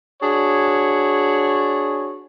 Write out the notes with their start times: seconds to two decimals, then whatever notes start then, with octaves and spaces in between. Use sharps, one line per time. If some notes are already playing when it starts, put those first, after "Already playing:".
0.22 D4 F#4 G#4 C#5